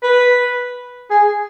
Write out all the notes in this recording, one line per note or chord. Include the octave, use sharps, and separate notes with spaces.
B4
G#4